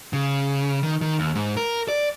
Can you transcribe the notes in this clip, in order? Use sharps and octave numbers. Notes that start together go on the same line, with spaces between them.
C#3
D#3
D#3
D#2
G#2
A#4
D5